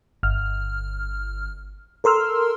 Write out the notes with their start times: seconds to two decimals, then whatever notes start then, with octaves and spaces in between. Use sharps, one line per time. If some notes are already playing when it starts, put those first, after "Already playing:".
0.23 G1 F6
2.04 A4 A#4 C6 E6 F6